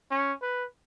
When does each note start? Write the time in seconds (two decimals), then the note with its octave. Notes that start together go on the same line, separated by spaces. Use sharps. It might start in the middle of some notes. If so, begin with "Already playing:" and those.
0.11 C#4
0.42 B4